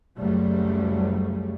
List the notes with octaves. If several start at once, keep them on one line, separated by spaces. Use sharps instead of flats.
F#1 C#2 C#3 F#3 G3 A3